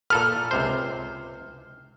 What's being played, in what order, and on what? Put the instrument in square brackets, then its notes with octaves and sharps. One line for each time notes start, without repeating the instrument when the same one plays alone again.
[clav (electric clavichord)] A#2 A4 B4 [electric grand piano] F6
[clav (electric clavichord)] C#2 C3 C5